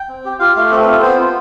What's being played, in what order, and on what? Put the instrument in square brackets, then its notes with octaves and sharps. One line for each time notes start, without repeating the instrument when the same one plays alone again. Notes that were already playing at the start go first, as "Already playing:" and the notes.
Already playing: [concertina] G5
C4
G4
F4 G4 F5
A3 F4 F5
C4 A4
B4
F4
A4
B3 C4 C5
F4